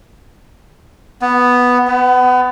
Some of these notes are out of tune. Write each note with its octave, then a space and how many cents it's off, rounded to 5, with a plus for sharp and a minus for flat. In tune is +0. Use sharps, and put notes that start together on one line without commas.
B3 +0
B3 +25